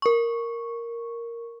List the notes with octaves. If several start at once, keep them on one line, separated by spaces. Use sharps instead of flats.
A#4 C#6